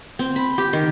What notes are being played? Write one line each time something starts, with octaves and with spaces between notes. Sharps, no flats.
C4
B5
G4
D#3